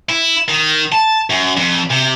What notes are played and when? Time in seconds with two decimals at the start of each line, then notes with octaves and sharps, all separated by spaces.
0.09 E4
0.48 D#3
0.92 A5
1.30 F#2
1.57 F2
1.90 C3